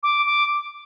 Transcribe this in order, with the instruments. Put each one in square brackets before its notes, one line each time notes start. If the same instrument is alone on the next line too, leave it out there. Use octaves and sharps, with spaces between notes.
[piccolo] D6
D6